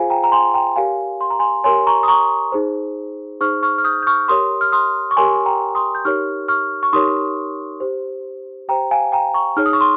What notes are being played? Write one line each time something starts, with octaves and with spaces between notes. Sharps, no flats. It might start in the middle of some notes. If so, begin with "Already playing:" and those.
Already playing: F4 G#4 C5 F5 G#5
G5 A#5
A#5
G#5 C6
G5 A#5
G4 A#4 C#5 F5 G#5
C6
A#5
G#5 C6
G4 A#4 C#5 G#5 C6
A#5 C#6
D#6
A#5 C#6
D#4 G#4 C5
D#4 G#4 C5 C#6 F6
C#6 F6
F6
D#6 G6
G6
C#6 F6
G4 A#4 C#5 C6 D#6
F6
C6 D#6
C#6
G4 A#4 C#5 G#5 C6
G5 A#5
C6 D#6
G6
D#4 G4 A#4 C#5 C#6 F6
C#6 F6
C#6
D#4 G4 A#4 C#5 C6 D#6
G4 C5
G4 C5 G5 A#5
F5 G#5
G5 A#5
A#5 C#6
D#4 G#4 C#5 F6
D#6
C#6
C6